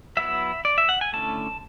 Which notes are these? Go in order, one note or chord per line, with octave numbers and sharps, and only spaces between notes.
F#3 B3 E4 E5
D5
E5
F#5
G#5
D3 A3 C#4 E4 A5